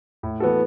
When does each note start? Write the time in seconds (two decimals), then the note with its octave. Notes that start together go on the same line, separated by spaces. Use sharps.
0.23 A2
0.40 E3 B3 F#4 A4